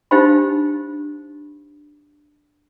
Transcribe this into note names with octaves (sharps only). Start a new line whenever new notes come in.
D4 D#4 G4 C5 F5 B5